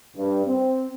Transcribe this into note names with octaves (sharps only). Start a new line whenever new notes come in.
G2
C4